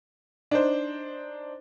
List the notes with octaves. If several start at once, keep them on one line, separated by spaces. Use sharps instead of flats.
D4 D#4 C5